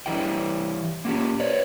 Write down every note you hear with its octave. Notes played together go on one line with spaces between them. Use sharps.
E3 G3 E4 G5
A#3 C#4 G4
B4 C#5 D5